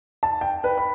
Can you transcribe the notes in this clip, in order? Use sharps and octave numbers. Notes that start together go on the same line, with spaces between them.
A5
G5
B4
B5